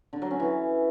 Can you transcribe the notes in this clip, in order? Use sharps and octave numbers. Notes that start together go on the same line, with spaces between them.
D3
F#3
C#4
E3